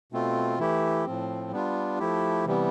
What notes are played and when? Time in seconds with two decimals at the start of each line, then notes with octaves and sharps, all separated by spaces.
0.12 B2 A3 C4 F4
0.59 E3 A3 E4 G4
1.05 A2 F3 C4
1.51 G3 B3 D4 F4
1.99 F3 A3 E4 G4
2.45 C3 E3 G3 B3